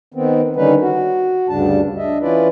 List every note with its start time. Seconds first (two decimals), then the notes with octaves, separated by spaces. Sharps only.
0.14 D#3 B3 C4
0.56 D3 D#3 G3 C#4 D#4 B4
0.80 F#4
1.49 D2 G2 C#3 G3 D4 A5
1.97 D4 D#5 E5
2.22 E3 C#4 E4 F4 B4 D5